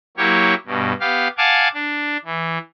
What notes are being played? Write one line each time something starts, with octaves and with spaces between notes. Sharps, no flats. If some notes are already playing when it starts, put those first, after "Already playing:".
F#3 A#3 E4 G4 C#5
G2 B2
B3 G4 F5
F5 F#5 G#5 A5 D6
D4
E3